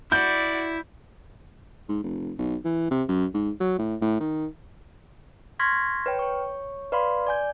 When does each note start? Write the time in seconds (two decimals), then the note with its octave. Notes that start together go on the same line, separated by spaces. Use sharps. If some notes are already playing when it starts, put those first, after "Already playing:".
0.12 E4 F#4 D5 G6
1.89 G#2
2.04 F1
2.39 B1
2.65 E3
2.91 C3
3.09 F#2
3.34 G#2
3.61 F#3
3.79 A2
4.02 A2
4.20 D#3
5.59 C6 C#6 F6 G#6 A#6 B6
6.06 B4 C#5 G5
6.19 C#5 C#6
6.92 B4 D5 F5 B5 C6
7.27 D5 G#5 G6